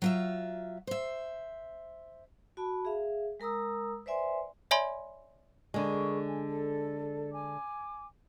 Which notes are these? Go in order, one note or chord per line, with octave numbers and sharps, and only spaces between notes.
F#3 F4 E5
C5 E5
F#4 A5 B5
G#4 E5 F5
G#3 A#4 A#5 D#6 E6
B4 C5 D5 E5 G#5 C6
C#5 D5 E5 G#5 B5 C6
D3 G#3 G#4 A#4 C#6
G#5
A4
G#5 D6